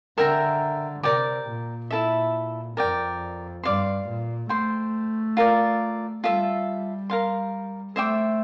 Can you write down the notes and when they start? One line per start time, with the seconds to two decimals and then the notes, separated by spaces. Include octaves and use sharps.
0.18 D3 A#4 E5 G5 A#5
1.03 C3 A#4 D5 G5 D6
1.48 A#2
1.91 E4 A4 E5
2.76 F2 A#4 D5 G5
3.63 G2 D5 F5 C6
4.07 A#2
4.49 A3 C5 G5 C6
5.37 F4 A#4 D5
6.23 G3 F4 A4 E5
7.10 A#4 F5 C6
7.96 A3 C5 E5 G5 D6